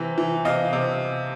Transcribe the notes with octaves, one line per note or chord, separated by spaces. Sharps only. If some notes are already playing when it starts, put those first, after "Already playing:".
Already playing: C3 E3
E3
C3 D#5 F5
C3